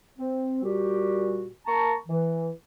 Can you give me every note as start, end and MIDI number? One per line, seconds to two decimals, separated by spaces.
0.18 0.59 60
0.63 1.46 46
0.63 1.46 55
0.63 1.46 66
0.63 1.46 67
1.66 1.94 58
1.66 1.94 81
1.66 1.94 82
1.66 1.94 85
2.08 2.50 52